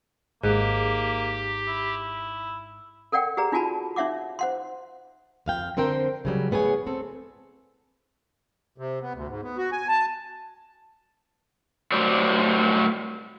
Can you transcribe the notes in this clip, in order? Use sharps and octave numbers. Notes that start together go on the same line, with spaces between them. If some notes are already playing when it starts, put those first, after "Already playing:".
G#1 G#2 A#3 G4
E4
A4 A#4 D5 F#5 G5
G4 G#4 B4 D5 A#5
D#4 F4 F#4 G#5 A5 B5
D#4 C#5 E5 F#5 D6
C5 F#5 C6
F2 F5 G5
D3 C4 A#4 C5 G5
C#3 F#3 G3
A2 B3 G#4 C#5 G#5
C4 A4
C3
B3
D2
G#2
B3
F#4
G#5
A5
A2 F#3 G3 C5 D5